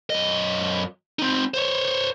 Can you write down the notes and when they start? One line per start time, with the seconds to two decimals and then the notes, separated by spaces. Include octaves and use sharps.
0.10 F#2 D#5
1.19 C4 D#4
1.54 C5 C#5